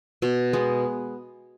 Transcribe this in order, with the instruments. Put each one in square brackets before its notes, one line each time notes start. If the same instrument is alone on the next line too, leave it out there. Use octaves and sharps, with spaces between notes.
[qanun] B2
G#3 B3